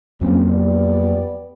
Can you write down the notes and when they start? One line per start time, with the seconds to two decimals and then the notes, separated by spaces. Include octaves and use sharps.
0.21 F2 C#3 F#3 A#3 C4
0.51 B3 G4 D5